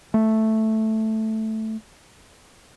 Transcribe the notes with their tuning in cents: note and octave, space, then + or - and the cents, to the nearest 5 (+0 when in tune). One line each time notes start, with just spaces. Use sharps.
A3 +0